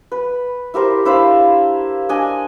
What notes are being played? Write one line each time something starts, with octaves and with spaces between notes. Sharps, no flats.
B4
E4 G4 A#4 C5
D4 E4 C5 F5
D4 D#5 G#5